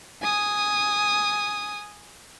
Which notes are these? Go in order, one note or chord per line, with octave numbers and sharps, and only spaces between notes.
G#5 D#6